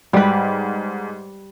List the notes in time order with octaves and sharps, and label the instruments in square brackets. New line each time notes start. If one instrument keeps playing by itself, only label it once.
[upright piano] G#2 [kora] G3 B4